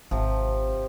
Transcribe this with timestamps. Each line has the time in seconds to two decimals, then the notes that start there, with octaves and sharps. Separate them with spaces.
0.11 G#1 C3 F3